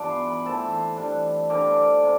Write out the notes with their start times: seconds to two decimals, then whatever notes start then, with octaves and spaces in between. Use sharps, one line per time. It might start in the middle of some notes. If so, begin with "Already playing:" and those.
Already playing: G2 E3 B3 D4 F4 A5 D6
0.10 C6
0.28 B5
0.45 E3 A3 C4 A5
0.72 C6
0.97 E3 G3 D4
1.50 D3 G3 C4 D6
1.67 C6
1.76 D6
2.03 C3